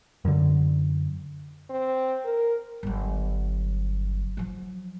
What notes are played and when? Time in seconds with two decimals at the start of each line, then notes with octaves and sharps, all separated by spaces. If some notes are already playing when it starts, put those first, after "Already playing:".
0.25 F#2 D3
1.70 C4
2.25 A#4
2.83 G1 F#3
4.37 F3 F#3